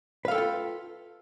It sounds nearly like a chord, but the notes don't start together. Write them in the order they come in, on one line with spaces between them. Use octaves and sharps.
B4 F5 A4 G5 F4